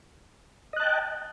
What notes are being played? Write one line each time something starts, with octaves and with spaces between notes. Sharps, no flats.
D#5 G5 A5 F#6